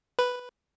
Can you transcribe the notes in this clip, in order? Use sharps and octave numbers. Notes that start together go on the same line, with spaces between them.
B4